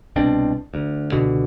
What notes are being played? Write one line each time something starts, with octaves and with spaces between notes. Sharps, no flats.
C2 B2 C4 D4
D2
C#2 B2 D3